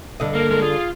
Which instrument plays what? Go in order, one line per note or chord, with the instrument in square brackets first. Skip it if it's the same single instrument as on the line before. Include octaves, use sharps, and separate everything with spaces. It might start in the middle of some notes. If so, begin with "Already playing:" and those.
[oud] G2 D3 D#5
[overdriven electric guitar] A#3 [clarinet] A#4
[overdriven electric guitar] G#3 A#3 [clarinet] A#4
[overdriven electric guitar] F4 [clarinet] G#4